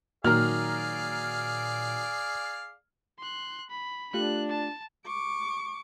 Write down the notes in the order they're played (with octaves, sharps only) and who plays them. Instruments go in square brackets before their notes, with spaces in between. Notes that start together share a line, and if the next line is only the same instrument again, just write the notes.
[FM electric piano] A#2 [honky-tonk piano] D#3 F#3 A#5 [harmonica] G#4 D5 F5 [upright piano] F6
[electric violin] C6 F#6
B5
[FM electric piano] A3 F4 G4 [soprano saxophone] D4 [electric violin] F#6
[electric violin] A5
[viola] C#6 D6